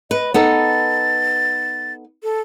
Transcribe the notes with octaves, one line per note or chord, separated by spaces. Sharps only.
B4 D#5
B3 D#4 A4 A6
A4